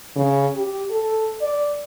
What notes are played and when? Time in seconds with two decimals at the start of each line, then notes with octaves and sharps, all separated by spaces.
0.16 C#3
0.56 G4
0.91 A4
1.41 D5